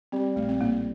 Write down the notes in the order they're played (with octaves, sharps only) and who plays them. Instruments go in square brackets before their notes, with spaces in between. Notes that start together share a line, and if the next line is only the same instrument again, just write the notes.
[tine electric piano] G3 [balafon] C4
[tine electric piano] A#1 [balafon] A3
[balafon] C4
[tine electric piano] A2 [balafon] A#3